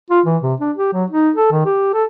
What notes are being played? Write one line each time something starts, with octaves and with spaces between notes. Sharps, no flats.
F4
E3
C3
D4
G4
F#3
D#4
A4
D#3
G4
A4